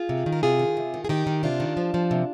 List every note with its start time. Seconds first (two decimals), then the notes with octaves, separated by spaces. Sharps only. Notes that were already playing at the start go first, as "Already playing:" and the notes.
Already playing: F4 G#4
0.09 C3
0.26 D#3
0.32 A#4
0.43 C3 F4 G#4
0.59 D#3
0.77 C3
0.94 D#3
1.05 G#4
1.09 D#3 D#4 G4
1.27 D#3
1.43 C3 D4 F4
1.60 D#3
1.77 F3
1.94 F3
2.11 C3